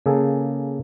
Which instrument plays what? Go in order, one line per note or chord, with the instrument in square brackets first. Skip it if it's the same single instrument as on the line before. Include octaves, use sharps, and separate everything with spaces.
[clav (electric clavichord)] C#3 A#3 G#4 A4